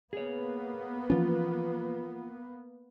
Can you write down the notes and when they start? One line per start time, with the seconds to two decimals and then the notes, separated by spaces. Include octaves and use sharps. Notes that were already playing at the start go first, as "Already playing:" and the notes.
0.13 A#3 B3 G#4 C#5
1.10 E3 F3 C#4 F4